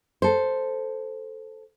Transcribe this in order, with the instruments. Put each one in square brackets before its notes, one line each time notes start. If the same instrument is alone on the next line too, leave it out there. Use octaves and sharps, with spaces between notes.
[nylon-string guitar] A4 C5